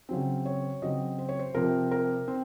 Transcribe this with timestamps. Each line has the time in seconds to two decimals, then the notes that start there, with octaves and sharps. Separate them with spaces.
0.09 C#3 F#3 C4
0.46 C#5
0.82 C#3 F#3 C4 D#5
1.18 C5
1.29 C#5
1.39 C5
1.55 C3 F3 C4 A#4
1.91 A#4
2.28 C4